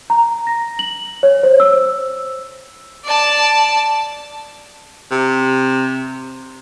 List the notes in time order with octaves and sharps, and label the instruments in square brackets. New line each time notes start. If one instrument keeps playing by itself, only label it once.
[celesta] A#5
A#6
F#7
C#5
C5
E6
[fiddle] D5 A5
[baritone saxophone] C3